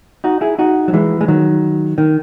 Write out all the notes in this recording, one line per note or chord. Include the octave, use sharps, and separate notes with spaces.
D#4 F#4
E4 G#4
D#4 F#4
F#3
E3 G#3
G#3
D#3 F#3
D#3